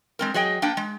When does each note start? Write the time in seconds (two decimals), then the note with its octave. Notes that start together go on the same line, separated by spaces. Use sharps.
0.19 G#3 C4 A#4
0.34 F#3 G#4 D#5 G5
0.62 A#3 D4 G5
0.77 G#3